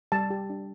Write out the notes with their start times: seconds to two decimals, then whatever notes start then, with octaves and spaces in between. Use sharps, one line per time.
0.12 G3 A5
0.30 G4
0.50 D4